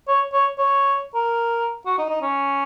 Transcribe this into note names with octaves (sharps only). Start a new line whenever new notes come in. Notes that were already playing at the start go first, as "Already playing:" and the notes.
C#5
C#5
C#5
A#4
F#4
D#4
D#4
C#4